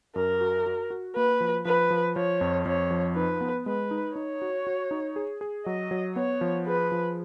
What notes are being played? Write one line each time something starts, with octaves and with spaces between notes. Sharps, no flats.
F#2 A#4
F#4
F#4
F#4
A#3 B4
F3
F3 B4
F3
F3 C#5
F2
F2 C#5
F3
D#4 B4
B3
G#3 B4
D#4
D#4 C#5
F#4
F#4
D#4
G#4
G#4
F#3 D#5
F#3
B3 C#5
F3
G#4 B4
F3